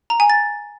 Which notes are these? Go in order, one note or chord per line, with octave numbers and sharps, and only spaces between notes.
A#5
G#5
A6